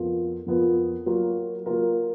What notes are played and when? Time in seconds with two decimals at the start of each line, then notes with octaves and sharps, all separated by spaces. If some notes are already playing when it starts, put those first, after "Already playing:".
Already playing: F2 F3 B3 F4 A#4
0.46 F2 F3 B3 F4 A#4
1.06 F#3 A#3 F4 A#4
1.66 F#3 A#3 F4 A#4